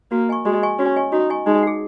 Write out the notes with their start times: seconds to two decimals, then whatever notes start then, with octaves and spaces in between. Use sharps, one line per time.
0.11 A#3 F#4
0.29 D#5 G#5 C#6
0.45 G#3 F#4
0.63 D#5 G#5 C#6
0.79 C#4 F#4
0.96 D#5 G#5 C#6
1.12 D#4 F#4
1.30 D#5 G#5 C#6
1.46 G#3 D#4
1.63 G#4 F#5